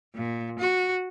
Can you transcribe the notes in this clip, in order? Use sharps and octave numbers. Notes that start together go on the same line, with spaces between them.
A#2
F#4